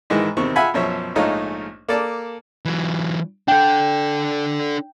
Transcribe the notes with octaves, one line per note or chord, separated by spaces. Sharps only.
G#2 D#3 E3 G#3
E2 C3 D#3 C4 C#6
F4 E5 F#5 G#5 B5
F#2 B2 F3 C#5 E5
A#1 G#2 A3 D#4 F4 C#5
A#3 A4 D5 A5
E3 F#3
D4 A4 G5 G6